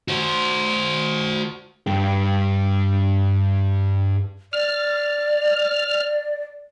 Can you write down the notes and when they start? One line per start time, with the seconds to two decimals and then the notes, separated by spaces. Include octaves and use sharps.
0.08 F#4 C5
1.87 G2 G4
4.53 D5 F6